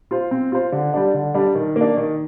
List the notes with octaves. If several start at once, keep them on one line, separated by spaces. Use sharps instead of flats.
F4 C5
C4
F4 C5
D3
G3 D4
D3
G3 D4
D#3
A#3
D4
D#3